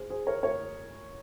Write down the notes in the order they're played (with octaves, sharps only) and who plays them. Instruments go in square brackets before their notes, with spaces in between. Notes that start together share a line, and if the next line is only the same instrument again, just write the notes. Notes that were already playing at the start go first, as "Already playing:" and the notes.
Already playing: [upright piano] G#4 C5
G#4 C5
A#4 C#5
A#4 C#5